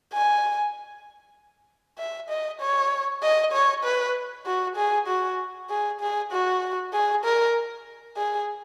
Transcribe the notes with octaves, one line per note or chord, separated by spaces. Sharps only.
G#5
E5
D#5
C#5
D#5
C#5
B4
F#4
G#4
F#4
G#4
G#4
F#4
G#4
A#4
G#4